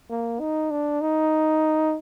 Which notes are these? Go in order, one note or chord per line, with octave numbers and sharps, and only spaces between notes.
A#3
D#4
D4
D#4